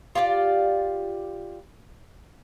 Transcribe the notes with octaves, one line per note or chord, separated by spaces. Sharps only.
F4 G4 C#5 D5